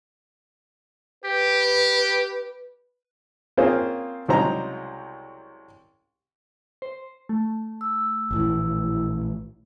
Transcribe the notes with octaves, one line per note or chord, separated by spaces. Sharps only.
G4 B4
A#3 C4 C#4 F4 G#4 C5
C2 C#3 F#3 G#3 C5 A#5
C5
A3
E6
A#1 A2 E3